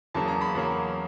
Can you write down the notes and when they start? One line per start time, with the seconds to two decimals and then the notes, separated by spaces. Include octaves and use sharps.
0.14 E2 C#3 F#3 A#3 A5
0.28 A#5
0.41 B5
0.55 E2 C#3 F#3 A#3